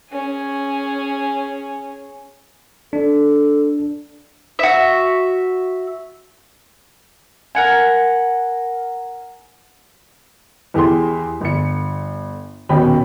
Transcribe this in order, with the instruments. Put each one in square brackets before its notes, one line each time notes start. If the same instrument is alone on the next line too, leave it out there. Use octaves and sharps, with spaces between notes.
[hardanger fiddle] C#4 G#4
[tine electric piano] D4 [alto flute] A4
[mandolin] F#4 E5
A#4 F#5 G#5
[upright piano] E2 E3 G4 G#4 C6
G1 C#7
D#1 B2 C#4 G5 B5